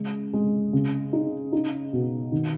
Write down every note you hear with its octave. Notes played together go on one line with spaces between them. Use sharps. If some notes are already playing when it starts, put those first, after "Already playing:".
Already playing: C#3 G#3
G#3
C#3
D#4
D#4
B2
D#3